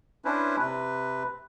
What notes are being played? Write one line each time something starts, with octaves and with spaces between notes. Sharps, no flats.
C#4 D4 E4 B4 C5
C3 B4